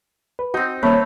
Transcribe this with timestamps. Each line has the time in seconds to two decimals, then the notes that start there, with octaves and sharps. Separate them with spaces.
0.39 B4
0.54 C4 D#4 F#4
0.83 D#1 A3 A#3 A#4 C#5 B5 E6 F#6